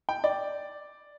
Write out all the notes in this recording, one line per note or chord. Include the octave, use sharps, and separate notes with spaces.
G5
D5